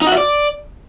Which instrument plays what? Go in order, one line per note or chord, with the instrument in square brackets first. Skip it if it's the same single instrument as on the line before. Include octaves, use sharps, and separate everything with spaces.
[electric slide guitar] D#4
F#4
E5
D5